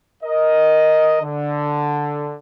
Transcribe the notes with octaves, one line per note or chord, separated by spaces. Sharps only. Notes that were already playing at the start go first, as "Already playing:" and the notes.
A#4 D#5
D3